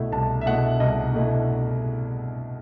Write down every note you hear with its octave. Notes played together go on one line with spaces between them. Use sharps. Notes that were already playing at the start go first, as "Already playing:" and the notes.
Already playing: C2 B2 A3 E4
C2 A5
E5
B2 A3 E4 F#5
E5
C2 D#5
B2 A3 E4